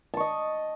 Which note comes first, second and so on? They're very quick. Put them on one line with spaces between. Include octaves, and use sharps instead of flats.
A5 C#6 D#5